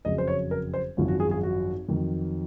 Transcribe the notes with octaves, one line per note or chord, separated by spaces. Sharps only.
F#1 F2 C#3 F#3 D#5
C5
C#5
A#4
C5
G#1 F#2 F3
F#4
G#4
G#4
F#4
F2 D#3 F#3